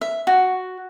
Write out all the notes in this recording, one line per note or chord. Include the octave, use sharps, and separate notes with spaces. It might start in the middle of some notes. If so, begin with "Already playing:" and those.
E5
F#4